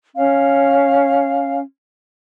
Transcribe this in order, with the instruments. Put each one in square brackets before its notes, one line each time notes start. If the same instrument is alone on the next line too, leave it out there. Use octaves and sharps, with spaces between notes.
[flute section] C#4 F5